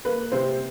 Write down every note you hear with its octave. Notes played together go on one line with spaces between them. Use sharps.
A#3 B4
C3 C5